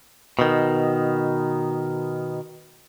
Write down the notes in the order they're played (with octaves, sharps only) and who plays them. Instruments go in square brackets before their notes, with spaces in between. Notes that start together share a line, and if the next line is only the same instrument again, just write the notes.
[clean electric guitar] B2 D#3